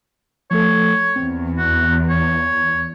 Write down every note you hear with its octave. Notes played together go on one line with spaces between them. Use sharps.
F3 A3 A4 C#5
E2 C4
D#2 F#4
C#5